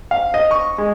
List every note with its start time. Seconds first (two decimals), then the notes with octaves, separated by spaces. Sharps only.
0.11 F5
0.34 D#5
0.51 C#6
0.78 G#3